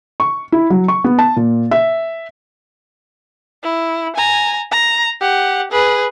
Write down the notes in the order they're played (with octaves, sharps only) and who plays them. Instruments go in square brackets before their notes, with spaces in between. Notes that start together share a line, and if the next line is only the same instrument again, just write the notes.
[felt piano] C#6
E4
F#3
C#6
B3
A5
A#2
E5
[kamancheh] E4
G#5 A#5
A#5
G4 F#5
G#4 B4